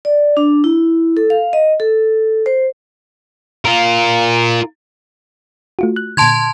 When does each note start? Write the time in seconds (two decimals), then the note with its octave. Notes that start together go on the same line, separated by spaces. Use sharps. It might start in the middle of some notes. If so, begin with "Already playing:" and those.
0.05 D5
0.37 D4
0.64 E4
1.17 A4
1.30 F5
1.53 D#5
1.80 A4
2.46 C5
3.65 F4 A#4
5.79 A3 F4 F#4
5.96 F#6
6.17 A#2 D3 A5 C6 G#6